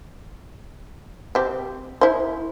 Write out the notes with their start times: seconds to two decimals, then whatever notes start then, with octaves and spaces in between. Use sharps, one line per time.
1.35 C4 G4
2.01 E4 C5